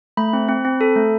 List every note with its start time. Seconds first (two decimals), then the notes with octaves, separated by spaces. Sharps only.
0.17 A3 B5
0.33 C4
0.49 C4
0.65 C4
0.81 A4
0.96 A3